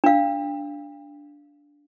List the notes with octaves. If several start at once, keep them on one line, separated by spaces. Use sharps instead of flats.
D4 F5